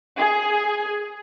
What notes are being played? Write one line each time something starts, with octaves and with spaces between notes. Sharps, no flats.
G#4